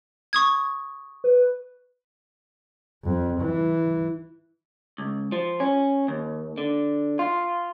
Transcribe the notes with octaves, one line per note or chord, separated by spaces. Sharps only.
C#6 D#6 G#6
B4
F2
E3
C#2
F3
C#4
D#2
D3
F4